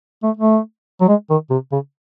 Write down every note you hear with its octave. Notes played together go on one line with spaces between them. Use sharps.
A3
A3
F#3
G#3
D#3
C3
C#3